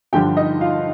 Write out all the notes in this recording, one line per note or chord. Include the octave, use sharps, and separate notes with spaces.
G2 D3 F3 G4 G5
D#4 D#5
F4 F5